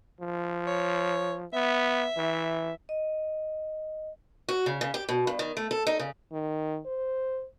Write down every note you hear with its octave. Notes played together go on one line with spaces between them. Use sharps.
F3
C#5
B3 E5
E3
D#5
F#4
C#3
C#3
G4
B2
G2
D#3
A3
A4
D#4
C#3
D#3
C5